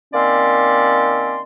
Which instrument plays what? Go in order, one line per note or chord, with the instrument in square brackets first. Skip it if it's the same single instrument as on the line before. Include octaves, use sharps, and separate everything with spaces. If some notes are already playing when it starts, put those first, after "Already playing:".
[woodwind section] D#3 A#3 C4 C#4 D5 C6